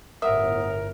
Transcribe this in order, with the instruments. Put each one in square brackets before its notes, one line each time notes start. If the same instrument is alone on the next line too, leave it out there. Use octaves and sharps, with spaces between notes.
[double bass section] G1 A2 [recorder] A#4 [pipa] E5 [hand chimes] F#5 D#6